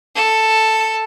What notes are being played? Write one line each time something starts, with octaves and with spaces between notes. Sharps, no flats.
A4